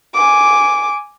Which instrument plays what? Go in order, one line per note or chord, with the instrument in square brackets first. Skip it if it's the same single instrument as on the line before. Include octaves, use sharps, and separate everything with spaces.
[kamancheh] G#5 D6